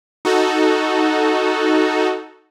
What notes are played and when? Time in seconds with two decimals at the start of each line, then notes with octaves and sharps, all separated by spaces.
0.25 D#4 F#4 A4